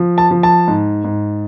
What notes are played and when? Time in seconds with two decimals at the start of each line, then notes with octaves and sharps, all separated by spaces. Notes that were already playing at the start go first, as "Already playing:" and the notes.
Already playing: F3
0.18 A5
0.31 F3
0.43 A5
0.68 G#2
1.04 G#2